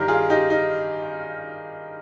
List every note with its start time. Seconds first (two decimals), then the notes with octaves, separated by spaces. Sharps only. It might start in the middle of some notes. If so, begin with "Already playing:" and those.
Already playing: G2 D#3 G4 A#4
0.08 F4 G#4
0.30 D#4 G4
0.50 D#4